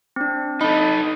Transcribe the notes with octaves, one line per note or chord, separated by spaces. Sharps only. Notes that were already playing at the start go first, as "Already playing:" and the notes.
C4 D4
D#4 A4 B5